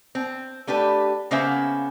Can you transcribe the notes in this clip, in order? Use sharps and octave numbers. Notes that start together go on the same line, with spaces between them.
C4
A3 D4 G4 B4
C#3 A#3 B3 C#4 C5 E5